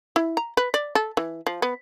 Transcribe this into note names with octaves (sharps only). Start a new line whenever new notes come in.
E4
A#5
B4
D5
A4
E3
F3
B3